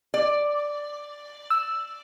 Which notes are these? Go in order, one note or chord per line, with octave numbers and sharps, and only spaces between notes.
D5
E6